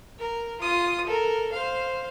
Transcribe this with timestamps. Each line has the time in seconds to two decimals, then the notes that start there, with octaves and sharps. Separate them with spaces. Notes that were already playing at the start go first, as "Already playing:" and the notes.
0.19 A#4
0.61 F4 D#6
1.07 A4 A#4
1.52 C5 F5